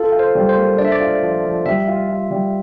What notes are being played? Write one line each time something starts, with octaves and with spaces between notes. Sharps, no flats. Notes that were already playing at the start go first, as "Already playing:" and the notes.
Already playing: F4 A4
F4
C5
G3
C5
A#3
D4 D5
E5
D5
F4
F3
F3
G3 E5
F4
F4
G3